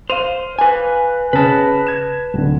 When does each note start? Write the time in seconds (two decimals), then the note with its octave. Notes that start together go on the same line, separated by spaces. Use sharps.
0.10 C5 F5 D#7 F7
0.59 B4 G#5
1.33 C#3 B4 A5
1.87 G#6 E7
2.34 D1 D3